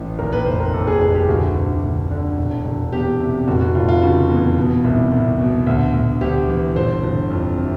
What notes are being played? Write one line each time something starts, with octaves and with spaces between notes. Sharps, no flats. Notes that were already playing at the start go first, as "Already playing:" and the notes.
Already playing: A1
D#2 A#4
B4
F1 C5
A#4
D#2 A4
G#4
F1 G#4
G4
D2 F#4
D2
D2
D3
E1
E1
E2 G4
C3
F1 F#4
F#4
F1 F4
F4
C#3 F#4
E2
B2
C2
C2
B2
D2
D2
D2 G4
E3
G1 C5
G1
F2
C3